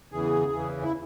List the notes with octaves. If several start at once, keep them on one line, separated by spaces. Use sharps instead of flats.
E2 C#3 E3 G#4
E2 C#3 E3
E4